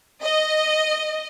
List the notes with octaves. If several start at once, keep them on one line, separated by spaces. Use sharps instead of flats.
D#5